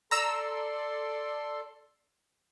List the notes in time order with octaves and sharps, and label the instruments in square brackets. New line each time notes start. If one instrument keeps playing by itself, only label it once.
[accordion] A4 C6 [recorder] D5 [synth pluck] A#5 E6